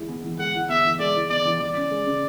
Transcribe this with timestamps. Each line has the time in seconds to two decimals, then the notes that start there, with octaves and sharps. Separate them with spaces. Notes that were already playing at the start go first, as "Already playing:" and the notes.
Already playing: E3 G#3 E4
0.08 B3
0.24 E3
0.39 G#3 F#5
0.55 E4
0.69 B3 E5
0.85 E3
0.99 G#3 D5
1.15 E4
1.30 B3 D5
1.45 E3
1.61 E3 D5
1.76 C#4
1.91 G#3
2.07 C#3